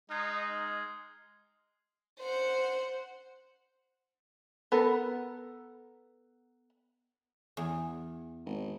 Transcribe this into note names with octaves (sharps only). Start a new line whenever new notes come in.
G#3 D#4 F6 G#6 C7
C5 F#5
B3 A4 A#4
E2
G#1